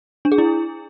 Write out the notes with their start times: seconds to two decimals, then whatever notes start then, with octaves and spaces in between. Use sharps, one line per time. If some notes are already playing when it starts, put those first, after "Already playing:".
0.25 D4
0.32 G#4
0.38 E4